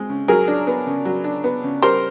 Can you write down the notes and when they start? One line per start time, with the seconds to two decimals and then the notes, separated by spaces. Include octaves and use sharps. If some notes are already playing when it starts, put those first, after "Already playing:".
Already playing: G#3 C4
0.09 C#3
0.28 F#3 G#4 A#4
0.48 D4
0.67 B3
0.87 C#3
1.05 F#3
1.24 D4
1.44 B3
1.63 C#3
1.82 G3 A#4 C5